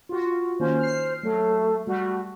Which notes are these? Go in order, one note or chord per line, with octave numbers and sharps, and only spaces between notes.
F4 F#4
D#3 A#3 C#4 C5
F6 C7
F#3 A3
G3 A3 F#4